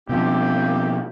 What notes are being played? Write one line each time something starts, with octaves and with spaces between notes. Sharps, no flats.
B2 F3 A#3 C4 G4